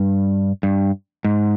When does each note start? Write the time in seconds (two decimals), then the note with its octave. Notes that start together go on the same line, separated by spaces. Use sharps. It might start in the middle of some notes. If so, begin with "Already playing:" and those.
Already playing: G2
0.63 G2
1.25 G#2